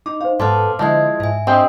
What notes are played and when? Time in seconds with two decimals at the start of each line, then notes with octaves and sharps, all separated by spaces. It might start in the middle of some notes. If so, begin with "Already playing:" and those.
0.06 D#4 D6
0.21 D#4 C5 F5
0.40 G#2 B3 A4 C6 D6 F6
0.79 D3 F3 G#3 E4 D#5 G#6
1.20 G#2 E5 G#5
1.47 C4 D4 G4 D#5 G5 C6 D#6